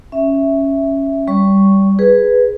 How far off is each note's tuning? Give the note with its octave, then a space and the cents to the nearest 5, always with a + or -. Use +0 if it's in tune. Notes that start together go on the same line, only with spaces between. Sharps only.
C#4 +0 E5 +0
G3 +0 D5 -45 C#6 +0
G#4 +0 B4 +0